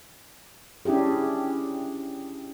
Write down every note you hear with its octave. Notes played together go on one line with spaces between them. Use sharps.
C#4 D4 E4 G4 G#4